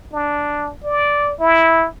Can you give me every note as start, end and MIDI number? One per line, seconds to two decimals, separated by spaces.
0.13 0.71 62
0.84 1.33 74
1.40 1.86 64